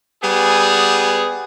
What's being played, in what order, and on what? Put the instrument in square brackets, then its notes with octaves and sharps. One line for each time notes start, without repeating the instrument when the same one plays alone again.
[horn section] G3 B3 G#4